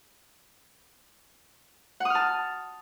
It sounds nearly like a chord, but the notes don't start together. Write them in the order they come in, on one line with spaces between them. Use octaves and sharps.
F#5 D#6 F6 A5